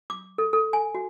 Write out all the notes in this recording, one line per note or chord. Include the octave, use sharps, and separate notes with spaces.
D6
A4
A4
G#5
F#4